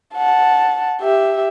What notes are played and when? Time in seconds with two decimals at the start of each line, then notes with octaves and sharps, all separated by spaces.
0.16 F#5 A5
1.01 G4 E5